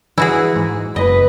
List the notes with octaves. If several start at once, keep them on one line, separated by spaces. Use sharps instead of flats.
E3 E4 F#4 G#4
G#2
F#1 B4 D#5